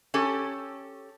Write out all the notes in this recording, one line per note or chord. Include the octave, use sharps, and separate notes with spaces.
C#4 G4 A4